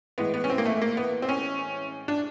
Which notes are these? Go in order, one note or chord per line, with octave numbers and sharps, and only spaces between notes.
A2 E3 G#3 B3
B3
C#4
C4
A#3
A3
A#3
B3
C4
C#4
D4